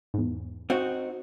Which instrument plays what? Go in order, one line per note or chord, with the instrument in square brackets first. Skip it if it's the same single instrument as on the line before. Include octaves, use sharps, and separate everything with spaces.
[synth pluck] E2 G#2
[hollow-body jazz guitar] C4 D#4 F#4